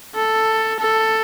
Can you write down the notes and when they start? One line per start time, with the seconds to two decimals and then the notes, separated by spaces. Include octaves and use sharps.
0.15 A4
0.80 A4